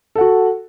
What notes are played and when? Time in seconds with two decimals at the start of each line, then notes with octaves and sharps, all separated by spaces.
0.15 A4
0.18 F#5
0.21 F#4